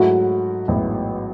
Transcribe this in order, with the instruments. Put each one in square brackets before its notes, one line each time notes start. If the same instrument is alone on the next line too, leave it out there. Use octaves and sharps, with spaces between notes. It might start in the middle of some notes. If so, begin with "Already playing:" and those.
Already playing: [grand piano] G#2 F#3 A3 E4 [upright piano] F#4
[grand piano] A1 G#2 F#3 B3 E4